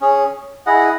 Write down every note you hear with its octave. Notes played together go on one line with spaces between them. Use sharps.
C#4 G#4 C#5
E4 G#4 D#5 F#5